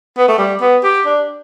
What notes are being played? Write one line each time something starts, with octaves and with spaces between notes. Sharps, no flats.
B3
A3
G3
B3
G4
D4